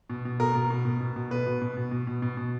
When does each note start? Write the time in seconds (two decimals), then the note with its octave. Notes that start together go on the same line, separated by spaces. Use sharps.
0.10 B2
0.25 B2
0.40 B2 A#4
0.55 B2
0.70 B2
0.85 B2
1.01 B2
1.16 B2
1.31 B2 B4
1.46 B2
1.62 B2
1.77 B2
1.91 B2
2.07 B2
2.22 B2
2.37 B2